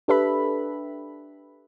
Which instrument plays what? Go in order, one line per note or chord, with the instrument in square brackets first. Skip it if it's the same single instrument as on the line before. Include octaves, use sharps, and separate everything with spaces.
[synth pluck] D4 G4 A4 B4 E5 B5